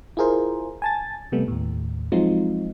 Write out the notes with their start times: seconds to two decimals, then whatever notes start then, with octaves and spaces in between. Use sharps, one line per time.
0.17 E4 F4 G#4 A#4 C5
0.82 G#5 A5 A6
1.32 C3 G3 A3 B3
1.48 D#2 A2
2.12 F3 F#3 G#3 C4 D#4 F4